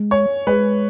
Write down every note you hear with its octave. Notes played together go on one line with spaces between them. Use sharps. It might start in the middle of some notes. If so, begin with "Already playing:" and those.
Already playing: G#3
C#5
G#3 B4